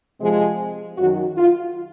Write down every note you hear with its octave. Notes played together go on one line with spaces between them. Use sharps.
C3 F3 G#3
F#2 D#3 F#3 F#4
F4